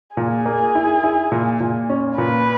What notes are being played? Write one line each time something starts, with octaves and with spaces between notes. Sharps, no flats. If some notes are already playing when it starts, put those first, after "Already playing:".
A#2 G#4
A#3
E4
E4
A#2
A#2
C#4
A#2 B4